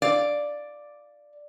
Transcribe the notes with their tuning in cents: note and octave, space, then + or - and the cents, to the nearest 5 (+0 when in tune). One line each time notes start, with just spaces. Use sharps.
D5 +0 F5 +0